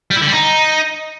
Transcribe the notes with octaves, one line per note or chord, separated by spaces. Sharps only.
G3
E4
D3
G3
D#4